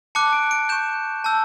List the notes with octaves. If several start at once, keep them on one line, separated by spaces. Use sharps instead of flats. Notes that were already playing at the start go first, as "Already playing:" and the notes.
A5 D6 F#6 C#7
D7
D7
C#6 G6 E7
A5 E6 G6